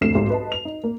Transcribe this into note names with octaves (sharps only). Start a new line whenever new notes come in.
F1 D2 A2 C7 E7
B1 G#2 G4
B4 D#5 A5
F7
D#4
A#3